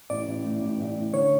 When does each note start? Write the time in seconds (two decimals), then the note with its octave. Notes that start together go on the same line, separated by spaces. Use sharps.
0.10 A1 D5
0.28 A1
0.44 A2
0.61 A1
0.79 A1
0.97 A2
1.13 D3 C#5